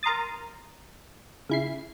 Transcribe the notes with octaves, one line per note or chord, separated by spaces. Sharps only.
A#4 A#5 C6 D#6 A6
C#3 E4 C7